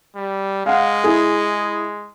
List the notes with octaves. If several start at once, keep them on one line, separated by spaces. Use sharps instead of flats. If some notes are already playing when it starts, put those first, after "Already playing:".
G3
G#3 F5 F#5
E4 G#4